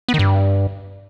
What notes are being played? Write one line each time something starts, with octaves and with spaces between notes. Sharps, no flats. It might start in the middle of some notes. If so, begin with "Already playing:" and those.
B3
D#3
G2